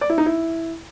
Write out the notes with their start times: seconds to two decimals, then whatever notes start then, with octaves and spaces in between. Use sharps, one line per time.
0.01 D5
0.10 E4
0.18 D#4
0.26 E4